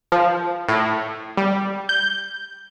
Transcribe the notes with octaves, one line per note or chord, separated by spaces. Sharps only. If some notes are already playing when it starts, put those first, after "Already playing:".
F3
A2
G3
G6